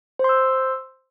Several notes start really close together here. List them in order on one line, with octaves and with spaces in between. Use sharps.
C5 C6 E6